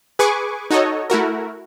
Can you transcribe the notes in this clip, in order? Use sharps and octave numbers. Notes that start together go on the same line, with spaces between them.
G#4 B4 G#5 C#6 D6
D#4 F#4 A4 C#5 D#5
A3 E4 F#4 A#4